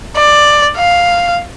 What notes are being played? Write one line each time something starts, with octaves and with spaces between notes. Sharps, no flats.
D5
F5